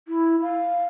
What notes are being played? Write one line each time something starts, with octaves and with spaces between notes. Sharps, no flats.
E4
F5